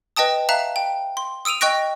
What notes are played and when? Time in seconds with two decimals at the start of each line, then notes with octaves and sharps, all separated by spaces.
0.17 B4 D#5 G5 A5 D#6
0.49 E5 F5 A5 A#5 F#6
0.76 G5
1.17 C6
1.45 D#6 E6 D7 D#7 F7
1.61 D#5 G5 C#6 F#6 A#6 D7